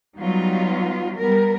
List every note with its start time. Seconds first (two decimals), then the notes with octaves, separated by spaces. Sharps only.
0.19 F#3 G3 B3 D#4 F4
1.18 G3 B3 A#4